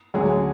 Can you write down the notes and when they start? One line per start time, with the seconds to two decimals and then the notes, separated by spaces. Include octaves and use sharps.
0.14 D2 D3 F#3 C#4 G#4